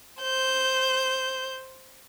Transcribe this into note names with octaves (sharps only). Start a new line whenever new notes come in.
C5 G6